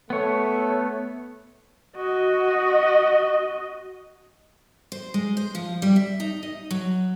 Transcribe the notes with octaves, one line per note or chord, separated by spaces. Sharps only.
A3 B3 C#5
F#4 D#5
C5
G#3
C5
F3
G3
E5
D#4
D#5
F#3